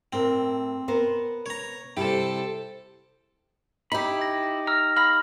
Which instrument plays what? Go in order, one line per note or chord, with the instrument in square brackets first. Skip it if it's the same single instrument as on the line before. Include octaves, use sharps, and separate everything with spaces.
[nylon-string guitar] A2 A#4 [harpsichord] C4
[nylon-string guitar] B3 A#4 C5
[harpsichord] C#5 A#5
[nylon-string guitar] C3 G3 E4 [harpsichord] G4 [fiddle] A4 C5
[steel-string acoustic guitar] D#4 G4 [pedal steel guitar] E4 B5
[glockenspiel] A#6
[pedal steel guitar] A#5 [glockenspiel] E6 F6
[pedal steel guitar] F5 A#5 [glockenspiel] B5 F6 F#7